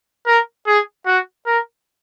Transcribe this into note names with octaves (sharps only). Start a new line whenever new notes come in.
A#4
G#4
F#4
A#4